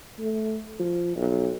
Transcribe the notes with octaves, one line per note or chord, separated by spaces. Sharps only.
A3
F3
B1